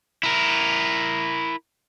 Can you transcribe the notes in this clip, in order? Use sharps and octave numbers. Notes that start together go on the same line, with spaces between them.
E4 A#4